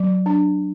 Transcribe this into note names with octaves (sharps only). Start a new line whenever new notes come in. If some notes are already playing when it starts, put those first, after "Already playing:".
Already playing: F#3
D4